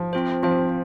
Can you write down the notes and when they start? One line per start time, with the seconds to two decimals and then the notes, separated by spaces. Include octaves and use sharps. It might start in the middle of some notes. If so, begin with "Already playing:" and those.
Already playing: F3
0.13 C4 F4 C5
0.43 F3 C4 F4 C5